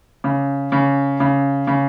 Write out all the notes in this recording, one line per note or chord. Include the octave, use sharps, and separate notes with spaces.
C#3
C#3
C#3
C#3